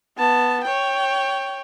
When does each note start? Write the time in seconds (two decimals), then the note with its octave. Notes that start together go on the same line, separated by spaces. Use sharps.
0.18 B3 A5
0.63 C#5 G5